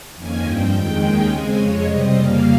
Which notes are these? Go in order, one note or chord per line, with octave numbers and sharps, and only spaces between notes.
F2 D#3 A#3 C#4 G#5
G2 F3 C4 G5
F2 D#3 G#3 G5
D#2 D#3 G#3 C#4
C#3 G#3 C4 G#5
F2 C#3 G#3 C#5
C3 G3 C4 D#5
F2 C#3 G3 A#3 F5